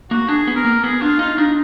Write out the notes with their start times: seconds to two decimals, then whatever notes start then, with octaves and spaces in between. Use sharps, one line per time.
0.11 A#3 F#4
0.28 D4 G#4
0.47 B3
0.56 A#4
0.65 A#3
0.84 B3 G#4
1.01 D4 F4
1.19 D#4 F4
1.38 D4 D#4